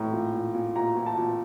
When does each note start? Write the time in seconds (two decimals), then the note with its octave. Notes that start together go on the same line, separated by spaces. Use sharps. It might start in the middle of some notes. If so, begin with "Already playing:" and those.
Already playing: A2 A#5
0.13 A#2
0.33 A#2
0.54 A#2
0.75 A#2 A#5
0.97 A#2
1.06 A5
1.17 A#2